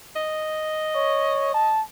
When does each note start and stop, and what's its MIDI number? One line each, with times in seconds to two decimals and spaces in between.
0.16 1.75 75
0.95 1.50 73
1.54 1.82 81